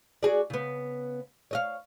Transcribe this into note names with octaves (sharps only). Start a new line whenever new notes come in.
F#4 G#4 D5
C#3 B3
C#5 D#5 F5